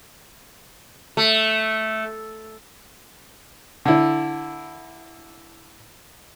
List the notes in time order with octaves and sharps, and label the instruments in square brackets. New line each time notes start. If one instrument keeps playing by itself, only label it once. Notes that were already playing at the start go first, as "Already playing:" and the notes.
[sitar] A3
[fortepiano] D3 E4